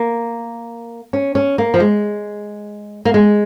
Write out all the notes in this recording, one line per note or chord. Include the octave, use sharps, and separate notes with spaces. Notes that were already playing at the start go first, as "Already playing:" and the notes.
Already playing: A#3
C#4
C#4
A#3
F3
G#3
A#3
G#3